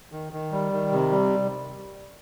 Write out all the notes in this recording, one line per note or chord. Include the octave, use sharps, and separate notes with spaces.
D#3
D#3
G3
D#3
C3
G3